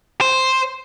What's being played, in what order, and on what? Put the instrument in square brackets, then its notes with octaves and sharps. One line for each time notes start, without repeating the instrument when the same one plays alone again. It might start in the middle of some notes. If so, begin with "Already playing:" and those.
[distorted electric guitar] C5